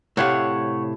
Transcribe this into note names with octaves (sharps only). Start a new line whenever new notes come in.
A2 C3 C#5 F5 F#5